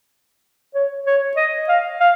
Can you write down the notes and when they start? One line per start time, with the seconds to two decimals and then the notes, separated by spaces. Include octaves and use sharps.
0.74 C#5
1.06 C#5
1.36 D#5
1.69 F5
2.01 F5